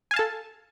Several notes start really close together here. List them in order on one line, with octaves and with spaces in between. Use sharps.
G#5 F5 A5 A4